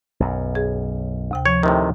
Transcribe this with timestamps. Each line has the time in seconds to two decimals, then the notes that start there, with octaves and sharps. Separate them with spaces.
0.20 B1 F#2
0.55 G#4
1.31 D2 C3 G5
1.45 F3 C#5
1.63 A2 C3 D#3